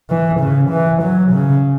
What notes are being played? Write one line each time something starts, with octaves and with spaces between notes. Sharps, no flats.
E3
C#3
E3
F#3
C#3